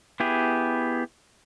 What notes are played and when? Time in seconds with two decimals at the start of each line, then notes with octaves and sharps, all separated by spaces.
0.20 B3 E4 G4 G#4